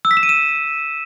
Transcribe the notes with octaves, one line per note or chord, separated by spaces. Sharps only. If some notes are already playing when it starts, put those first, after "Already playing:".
E6
B6
E7
D#7
E7